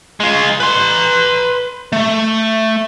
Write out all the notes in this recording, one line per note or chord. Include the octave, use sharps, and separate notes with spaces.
G#3 F4
B4 C6
A3